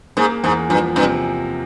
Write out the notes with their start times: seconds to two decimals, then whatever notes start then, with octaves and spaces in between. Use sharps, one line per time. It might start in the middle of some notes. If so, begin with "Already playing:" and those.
0.17 G#2 A#3
0.43 E2 G#2
0.69 G2 F3
0.95 G2 C3